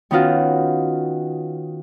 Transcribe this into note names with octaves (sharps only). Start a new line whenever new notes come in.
D#3 B3 C#4 D#4 F4 F#4